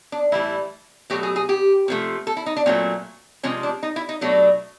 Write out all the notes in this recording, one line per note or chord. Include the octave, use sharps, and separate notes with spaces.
D4
A2 E3 G3 E4
B2 F#3 A3 G4
G#4
G#4
G4
C3 F3 A3
A4
E4
D#4
D4
A#2 F#3 A3 C4
C3 F3 G#3 C#4
D4
D#4
E4
D#4
B2 F#3 A3 D4